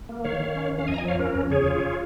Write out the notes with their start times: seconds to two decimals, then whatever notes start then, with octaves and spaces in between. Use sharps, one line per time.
0.09 A#3
0.24 D#3 C#5 F5
0.40 D#3
0.56 C#4
0.72 C#4
0.79 F5
0.88 F2 D#5 G#5
0.94 A#5
0.98 D#5 G#5
1.04 F3 C#5 F5
1.19 C#4 A#4
1.35 F2
1.50 C#3 G#4 C#5
1.67 F4
1.83 F4